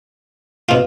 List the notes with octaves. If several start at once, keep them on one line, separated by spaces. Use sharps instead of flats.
B2 F4